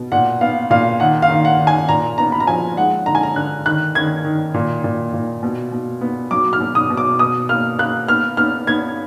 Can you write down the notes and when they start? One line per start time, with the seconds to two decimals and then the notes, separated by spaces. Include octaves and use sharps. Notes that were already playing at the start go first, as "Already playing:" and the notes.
Already playing: B2
0.12 A#2 F#5
0.41 B3 F5
0.70 A#2 F5
1.00 D#3 F#5
1.22 F5
1.29 D#3
1.45 F#5
1.60 D#3
1.67 G#5
1.89 A#2 A#5
2.18 B3 A#5
2.32 B5
2.40 A#5
2.47 F3 G#5
2.77 G#3 F#5
3.06 D3 A#5
3.15 G#5
3.23 A#5
3.36 D3 F#6
3.66 D#3 F#6
3.95 D#3 G#6
4.24 D#3
4.54 A#2
4.84 A#2
5.13 A#2
5.43 B2
5.72 B2
6.01 B3
6.31 F#3 D6
6.53 F6
6.60 B2
6.75 D#6
6.90 B2
6.97 D6
7.19 B2 D#6
7.49 A#3 F6
7.78 A#3 F#6
8.08 B3 F6
8.37 B3 F6
8.67 B3 G#6